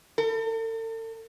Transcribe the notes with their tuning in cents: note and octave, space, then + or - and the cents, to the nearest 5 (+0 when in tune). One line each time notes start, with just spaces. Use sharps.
A4 +40